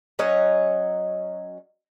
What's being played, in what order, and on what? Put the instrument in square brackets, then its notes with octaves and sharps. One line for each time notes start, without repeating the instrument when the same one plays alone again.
[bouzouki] F#3 C#4 C#5 D#5